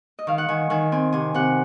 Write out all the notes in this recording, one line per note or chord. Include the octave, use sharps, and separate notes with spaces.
D#5
D#3 F5
F#5
D#3 G#5
D#3 G#5
C4 G#5
C3 G#5
C3 F#5